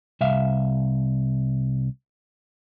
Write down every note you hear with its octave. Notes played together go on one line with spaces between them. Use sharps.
C2 E5 F5